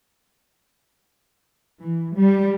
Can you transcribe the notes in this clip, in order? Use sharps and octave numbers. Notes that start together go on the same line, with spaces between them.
E3
G3